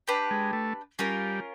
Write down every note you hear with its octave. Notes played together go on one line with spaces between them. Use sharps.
D4 G4 B4
G#3
A3
G3 C#4 F4 A#4